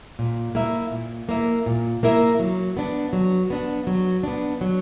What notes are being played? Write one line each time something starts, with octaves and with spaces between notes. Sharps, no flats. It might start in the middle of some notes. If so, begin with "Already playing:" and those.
A#2
A#3 E4 A#4 E5
A#2
A#3 E4 A#4 E5
A#2
A#3 E4 A#4 E5
F#3
B3 D4
F#3
B3 D4
F#3
B3 D4
F#3